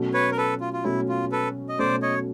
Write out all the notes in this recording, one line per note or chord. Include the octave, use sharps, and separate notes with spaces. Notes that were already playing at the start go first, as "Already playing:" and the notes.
Already playing: B2 F#3 A3 C#4
B4 C#5
A#4
A4 B4
F4
F4
B2 F#3 A3 C#4 E4
F4
A4 B4
D#5
B2 F#3 A3 C#4 C5 D5
C#5 D#5